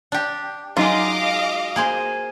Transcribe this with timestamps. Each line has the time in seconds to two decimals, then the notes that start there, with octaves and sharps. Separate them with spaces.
0.12 D4 G4
0.77 F#3 G#3 D#4 F4 D#5 F5 D6
1.76 A#3 G#4 C5